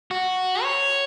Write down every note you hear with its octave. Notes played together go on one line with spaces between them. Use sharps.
F#4
C#5